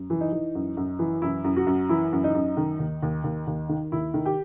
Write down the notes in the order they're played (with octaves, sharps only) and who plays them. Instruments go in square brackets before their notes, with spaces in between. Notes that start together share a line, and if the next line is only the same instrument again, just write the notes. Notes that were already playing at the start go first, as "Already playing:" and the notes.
Already playing: [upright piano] F#2
E3
D#4
E3
F#2
F#2
E3
F#2 E4
F#2
F#4
F#2
E3 E4
F#2
D#4
F#2
D#3
D#2
D#2
D#2
D#2
D#3
D#2 E4
D#3
G4